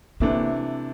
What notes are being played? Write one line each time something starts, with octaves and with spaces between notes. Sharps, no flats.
C3 E3 A3 A#3 D4